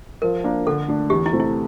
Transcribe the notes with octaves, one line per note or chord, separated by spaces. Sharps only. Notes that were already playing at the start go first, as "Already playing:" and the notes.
F3 A#4
A#3 D4
D3 A4
A3 D4
E2 G4
E4
C3 E3 A3 C4
E4